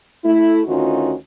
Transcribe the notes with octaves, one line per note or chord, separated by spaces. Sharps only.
A3 E4
D2 D#3 C#4 D#4 F4 F#4